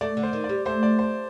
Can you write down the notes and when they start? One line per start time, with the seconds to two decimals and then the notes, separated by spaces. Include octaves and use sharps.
0.01 A3 D5
0.17 D3
0.23 C5
0.33 D#3
0.44 D5
0.49 G3
0.66 A3 C5
0.83 D5
0.99 C5